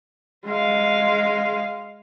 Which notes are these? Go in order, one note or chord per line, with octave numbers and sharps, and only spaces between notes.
G#3 F5